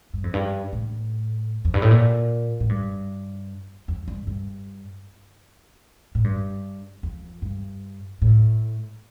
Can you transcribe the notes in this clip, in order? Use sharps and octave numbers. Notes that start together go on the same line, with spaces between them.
G2
F2
G2
A2
F2
G2
A2
A#2
A2
G2
F2
G2
G2
A2
G2
F2
G2
A2